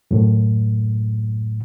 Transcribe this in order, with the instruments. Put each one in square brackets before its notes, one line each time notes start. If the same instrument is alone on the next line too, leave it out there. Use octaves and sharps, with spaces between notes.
[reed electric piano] F#2 A2